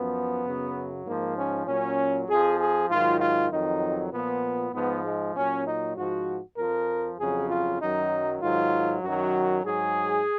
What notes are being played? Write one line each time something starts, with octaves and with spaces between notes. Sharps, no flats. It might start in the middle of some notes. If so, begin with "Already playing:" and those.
Already playing: F#2 F3 B3
F#2 C#3 F#3
G#2 F3 A#3
C#4
A#2 F#3 C#4
F2 F3 G#4
G#4
G#2 D#3 F#3 F4
F4
F2 D#3 F#3 D#4
A#2 F3 B3
G#2 F3 B3
G#3
A#2 F#3 C#4
D#4
G#2 F3 F#4
F2 F3 A#4
F2 C#3 F#3 G#4
F4
F#2 D#3 F#3 D#4
G#2 D#3 F#3 F4
F#2 D#3 F#3 F#4
G#2 F#3 G#4